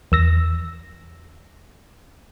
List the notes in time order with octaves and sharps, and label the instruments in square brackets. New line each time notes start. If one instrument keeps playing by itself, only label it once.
[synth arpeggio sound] E2 E6 A#6